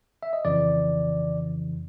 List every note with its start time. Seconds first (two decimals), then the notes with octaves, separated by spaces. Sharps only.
0.23 E5
0.33 D#5
0.45 F2 C#3 E3 D5